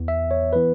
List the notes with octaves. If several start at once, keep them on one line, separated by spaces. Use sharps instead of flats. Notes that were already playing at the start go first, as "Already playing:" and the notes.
Already playing: E2 E3 B3
E5
C#5
E3 B3 B4